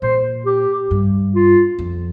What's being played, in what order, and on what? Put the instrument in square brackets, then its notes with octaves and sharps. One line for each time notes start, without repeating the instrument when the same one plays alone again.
[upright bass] A#2 [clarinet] C5
[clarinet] G4
[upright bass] G2
[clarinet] F4
[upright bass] F2